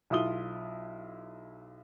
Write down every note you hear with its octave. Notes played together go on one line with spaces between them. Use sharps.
B1 E4 F4 D#6 G7